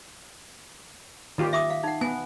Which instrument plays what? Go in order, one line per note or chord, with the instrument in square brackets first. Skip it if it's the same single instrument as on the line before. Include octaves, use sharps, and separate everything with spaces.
[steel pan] D#3 F4 G4
[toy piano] E5 D6 D#6
F5
D#4 F#5
[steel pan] B3 [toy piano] G#5